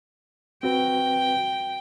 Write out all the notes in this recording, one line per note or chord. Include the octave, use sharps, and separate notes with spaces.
C4 F#4 B4 G5